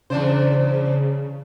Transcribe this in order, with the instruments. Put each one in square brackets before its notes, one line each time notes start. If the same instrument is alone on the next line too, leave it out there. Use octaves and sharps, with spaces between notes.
[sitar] E2 D4 C5 [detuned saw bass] C#3